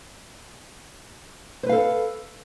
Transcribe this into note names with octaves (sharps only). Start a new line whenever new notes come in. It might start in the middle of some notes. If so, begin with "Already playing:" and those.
A4 B4 C5 F5